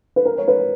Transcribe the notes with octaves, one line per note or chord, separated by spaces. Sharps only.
B4
A#4
C#5
B4